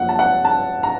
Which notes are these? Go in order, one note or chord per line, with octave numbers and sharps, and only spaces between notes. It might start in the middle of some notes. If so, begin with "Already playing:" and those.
Already playing: F#2 F3 A#3 C#4 F#5
A5
F#5
A5
A#5